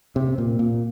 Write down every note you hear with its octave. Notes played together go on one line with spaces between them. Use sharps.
C3
A#2
A#2